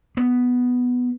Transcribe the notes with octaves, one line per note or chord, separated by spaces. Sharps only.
B3